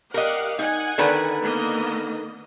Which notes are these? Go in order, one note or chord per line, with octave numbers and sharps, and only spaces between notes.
G4 A#4 D#5 F5 F#5
D#4 F#5 G#5
D3 D#3 B4
A#3 B3 D#5